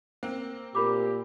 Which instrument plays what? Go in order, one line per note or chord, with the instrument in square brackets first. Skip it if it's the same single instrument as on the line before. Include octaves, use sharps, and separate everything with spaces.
[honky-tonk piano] A#3 C4 [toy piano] C5
[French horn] A#2 [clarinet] G4 [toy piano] A#4 B5 D6